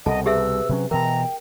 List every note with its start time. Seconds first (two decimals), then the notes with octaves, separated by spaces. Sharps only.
0.06 C2 B2 A4 D#5 F#5 A5
0.26 G4 G#4 B4 E5 E6
0.69 C3 F#3 C#4
0.91 B2 E3 A#4 G5 A#5